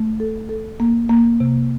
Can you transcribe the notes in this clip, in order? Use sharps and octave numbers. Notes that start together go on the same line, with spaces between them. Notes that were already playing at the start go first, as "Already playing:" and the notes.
Already playing: A3
A4
A4
A#3
A#3
C3